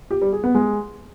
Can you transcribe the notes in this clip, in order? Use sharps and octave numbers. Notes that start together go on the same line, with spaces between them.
G4
G3
G#4
B3
G#3